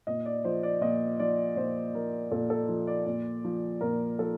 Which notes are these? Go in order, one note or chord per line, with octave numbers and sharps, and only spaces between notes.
A#2 D#5
D5
F3 C5
D5
A#2 D#5
F3 D5
A#2 C5
F3 A#4
A#2 A4
A4
F3
D5
A#2
F3
A#2 A#4
F3 A4